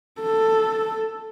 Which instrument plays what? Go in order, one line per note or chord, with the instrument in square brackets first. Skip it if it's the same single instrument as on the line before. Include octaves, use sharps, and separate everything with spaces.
[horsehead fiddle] A4